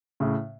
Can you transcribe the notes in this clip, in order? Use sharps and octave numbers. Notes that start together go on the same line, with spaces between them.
A2 C#3